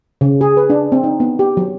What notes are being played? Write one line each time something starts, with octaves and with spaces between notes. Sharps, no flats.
C#3
G#4
B4
D4
C4
D#4
B3
G4
F#3